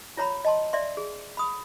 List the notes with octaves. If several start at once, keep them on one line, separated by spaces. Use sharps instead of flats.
F4 C#5 A#5 B5
D#5 A5 C6
D5 E5 C6
G#4
B5 D#6